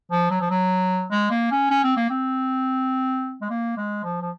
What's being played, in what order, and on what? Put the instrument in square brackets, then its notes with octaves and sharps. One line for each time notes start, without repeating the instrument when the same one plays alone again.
[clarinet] F3
F#3
F3
F#3
G#3
A#3
C#4
C#4
C4
A#3
C4
G#3
A#3
G#3
F3
F3